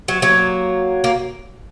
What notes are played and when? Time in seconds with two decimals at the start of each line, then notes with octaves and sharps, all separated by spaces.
0.08 F#3
0.22 F#3 A#3
1.04 A#3